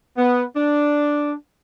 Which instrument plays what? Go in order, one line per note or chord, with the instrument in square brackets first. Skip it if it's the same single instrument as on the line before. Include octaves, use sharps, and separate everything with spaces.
[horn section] B3
D4